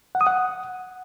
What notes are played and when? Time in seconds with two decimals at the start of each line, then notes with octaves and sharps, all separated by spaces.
0.15 F#5
0.21 D#6
0.27 F#5